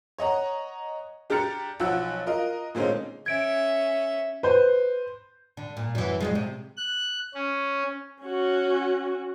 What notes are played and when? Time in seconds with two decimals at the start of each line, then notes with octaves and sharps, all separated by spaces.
0.18 C#5 D#5 F#5 A#5
1.30 D4 G4 A#5 F6 A6 C#7
1.80 B1 F3 F#5 E6 F#6
2.26 F4 A#4 D#5
2.75 A#2 D3 G#3 C4 C#4 D#4
3.26 C#4 E5 G#6 D7
4.43 B4 C5
5.57 D3
5.77 A#2
5.95 F#2 E3
6.20 F2 G#2 G#3
6.35 C3
6.77 F#6
7.34 C#4
8.22 C#4 F#4